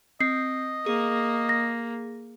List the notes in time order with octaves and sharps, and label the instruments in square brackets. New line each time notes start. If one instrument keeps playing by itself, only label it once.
[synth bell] C4 [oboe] D#5 [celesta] C7
[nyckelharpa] A#3 [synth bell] G#4
[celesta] A#6